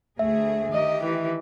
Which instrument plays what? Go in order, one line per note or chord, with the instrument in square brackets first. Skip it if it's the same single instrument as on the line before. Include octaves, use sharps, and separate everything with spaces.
[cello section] D2 A3 G#4 [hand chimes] E5
[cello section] D#3 G4 [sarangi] D#5
[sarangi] E3